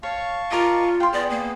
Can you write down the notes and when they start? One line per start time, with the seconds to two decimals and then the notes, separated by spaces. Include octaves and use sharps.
0.03 C#5 F5 A5 C#6
0.52 F4 A#4 D5 D#5
1.00 F5 G5 C6
1.13 B3 G#4 D5
1.30 A#3